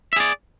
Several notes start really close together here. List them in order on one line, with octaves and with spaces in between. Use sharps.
E5 G#4 D5